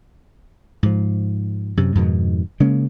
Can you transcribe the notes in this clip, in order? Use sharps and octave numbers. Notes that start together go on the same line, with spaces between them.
G#2 F3
F#2 C3
F2 G#2 B2 D#3
C#3 G#3 A#3 C#4